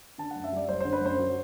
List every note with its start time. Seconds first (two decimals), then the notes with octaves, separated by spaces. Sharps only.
0.18 D3 A5
0.31 F#2 F#5
0.44 E5
0.52 G3 D5
0.69 F#1 C5
0.80 D3 C5
0.93 B4
1.01 F#2 C5
1.18 F#3